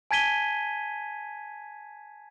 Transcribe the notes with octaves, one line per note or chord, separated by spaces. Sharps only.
G#5 A5 G#6 B6 D#7 G7